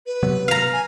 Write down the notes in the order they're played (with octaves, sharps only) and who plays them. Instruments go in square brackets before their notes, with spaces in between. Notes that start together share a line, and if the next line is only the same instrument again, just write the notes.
[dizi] B4
[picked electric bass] C3 F#3 B3
[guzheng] F5 A#5
[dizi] G#5